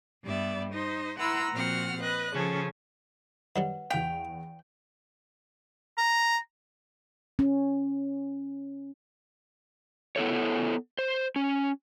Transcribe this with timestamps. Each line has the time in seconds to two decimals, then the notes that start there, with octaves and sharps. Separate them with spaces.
0.23 G2 G3 B3 D5 E5
0.72 D#4 C5 D#5
1.18 E4 B4 F#5 A#5 C6 E6
1.52 A#2 F3 C4 F#4 F#5 F6
2.01 B4 D#5 F#6
2.33 C#3 F3 C#4 G#4 A4
3.56 D#3 F#3 G3 B4 F#5
3.90 E2 F5 G5 F7
5.98 A#5
7.39 C#4
10.16 B3 E4 A4 C#5
10.99 C5
11.36 C#4